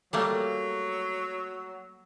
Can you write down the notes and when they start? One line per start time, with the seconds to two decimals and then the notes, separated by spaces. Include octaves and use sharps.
0.13 F#3 G3 A3 A#3